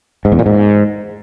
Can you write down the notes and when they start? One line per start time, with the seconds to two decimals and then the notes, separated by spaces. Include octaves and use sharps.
0.25 G#2
0.32 E2
0.39 A#2
0.46 G#2